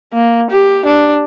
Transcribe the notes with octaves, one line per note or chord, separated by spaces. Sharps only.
A#3
G4
D4